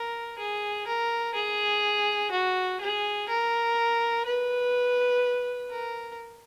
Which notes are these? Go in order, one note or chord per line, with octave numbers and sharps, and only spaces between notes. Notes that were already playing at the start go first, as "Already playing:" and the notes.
Already playing: A#4
G#4
A#4
G#4
F#4
G#4
A#4
B4
A#4